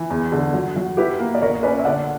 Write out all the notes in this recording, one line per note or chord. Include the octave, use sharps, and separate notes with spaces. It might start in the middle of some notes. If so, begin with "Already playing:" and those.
Already playing: E3
E2
D3
F#3
F#3
E4 G4 B4
A#3
D5
A#1 A#4 C#5
C#4 B4 D5
E5
D3 D5 F#5